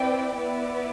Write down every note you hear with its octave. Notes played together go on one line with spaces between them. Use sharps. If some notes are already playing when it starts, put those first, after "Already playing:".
Already playing: C4 E4 B4 D5 G5
B3 E4 B4 D5